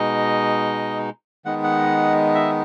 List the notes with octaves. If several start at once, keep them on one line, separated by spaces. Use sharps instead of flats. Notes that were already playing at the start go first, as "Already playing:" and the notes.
Already playing: B2 G#3 D#4 D#5
D#3 G#3 B3 D#4 F#5
F#5
E5